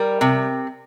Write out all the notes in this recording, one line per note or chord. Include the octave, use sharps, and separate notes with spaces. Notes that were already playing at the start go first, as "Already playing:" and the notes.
Already playing: G3 A#4
C3